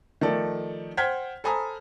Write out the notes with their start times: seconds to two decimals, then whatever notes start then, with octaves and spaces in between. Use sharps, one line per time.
0.21 D#3 F3 A3 A4 D5
0.97 C5 F#5 G5 F6 G#6 B6
1.44 A4 C5 G#5 A#5 B5 D#6